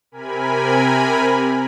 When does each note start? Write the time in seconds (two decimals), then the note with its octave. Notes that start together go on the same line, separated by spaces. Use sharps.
0.12 C3 A#4 G#5 B5